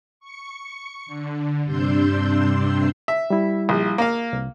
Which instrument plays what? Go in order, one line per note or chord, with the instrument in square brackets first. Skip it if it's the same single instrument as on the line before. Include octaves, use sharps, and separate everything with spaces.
[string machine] C#6 C#7
D3
G2 C3 D4 C6 E6 G6
[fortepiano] E5
[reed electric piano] G3 E4
[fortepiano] A#1
A#3 F5
[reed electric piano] C2